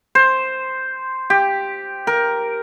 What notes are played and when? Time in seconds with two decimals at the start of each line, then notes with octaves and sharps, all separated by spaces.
0.15 C5
1.30 G4
2.07 A#4